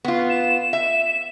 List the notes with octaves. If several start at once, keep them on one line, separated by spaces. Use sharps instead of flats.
B3 F4
E7
E5